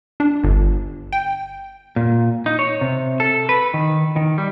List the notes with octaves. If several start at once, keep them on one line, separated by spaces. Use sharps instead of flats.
D4
G1
G5
A#2
D#4
C#5
C3
A4
B4
D#3
D#3
G3